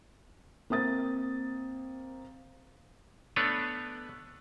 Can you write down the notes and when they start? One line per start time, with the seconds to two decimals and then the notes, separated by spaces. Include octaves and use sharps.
0.70 A#3 C4 D#6 A6
3.36 A3 B3 D4 B4 C#5